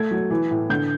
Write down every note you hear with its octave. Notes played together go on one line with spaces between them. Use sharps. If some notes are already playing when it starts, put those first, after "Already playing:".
Already playing: A3 G#6
F#3
E3
A2
D3 G6